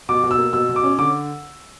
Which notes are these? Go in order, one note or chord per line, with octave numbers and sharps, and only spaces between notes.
B2 D6
B2
E6
A#3
B2 E6
B2
D6
C#4
D3 D6